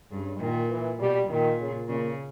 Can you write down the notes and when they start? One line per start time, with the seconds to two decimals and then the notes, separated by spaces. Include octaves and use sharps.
0.11 G2 C#3
0.40 A#2 D#3
0.70 E3
0.99 B2 G3
1.29 A#2 D#3
1.59 C#3
1.88 A#2 C#3